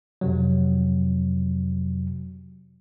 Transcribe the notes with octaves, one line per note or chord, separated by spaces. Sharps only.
F2 C3 F#3